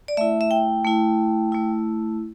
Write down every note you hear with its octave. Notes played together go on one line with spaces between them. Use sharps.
D5
A3 E4 E5
E5
G5
A3 E4
A3 E4